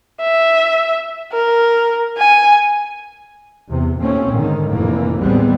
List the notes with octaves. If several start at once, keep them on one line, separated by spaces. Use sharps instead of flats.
E5
A#4
G#5
E2 C3
D#2 A#2 A3 C4 C#4
G#2 D3 D#3
F1 A2 E3 A3 A#3
A1 D#2 G3 G#3 B3 C4